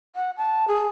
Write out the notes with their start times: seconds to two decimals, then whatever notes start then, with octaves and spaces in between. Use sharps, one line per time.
0.16 F#5
0.37 A5
0.68 G#4